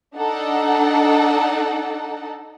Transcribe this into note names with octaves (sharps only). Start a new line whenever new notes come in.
D4 D#4 A4 F#5